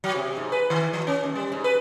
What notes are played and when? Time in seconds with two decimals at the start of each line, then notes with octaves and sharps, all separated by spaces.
0.04 F#3
0.16 C3
0.37 G#2
0.52 B4
0.70 D#3
0.93 F3
1.07 C#4
1.24 D#2
1.35 G3
1.52 G#2
1.64 B4